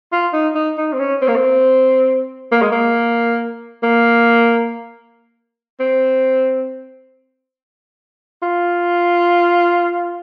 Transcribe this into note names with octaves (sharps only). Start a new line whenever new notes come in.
F4
D#4
D#4
D#4
C4
C#4
C4
A#3
C4
A#3
G#3
A#3
A#3
C4
F4